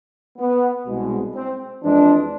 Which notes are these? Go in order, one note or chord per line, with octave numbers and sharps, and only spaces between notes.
B3
C2 B2 G#3
C4
F2 E3 G#3 D4